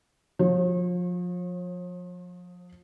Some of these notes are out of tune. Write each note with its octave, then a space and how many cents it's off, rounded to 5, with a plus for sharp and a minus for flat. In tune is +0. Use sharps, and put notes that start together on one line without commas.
F3 +30 C#5 -45